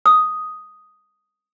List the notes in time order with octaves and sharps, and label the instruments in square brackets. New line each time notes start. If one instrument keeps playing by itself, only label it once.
[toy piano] D#6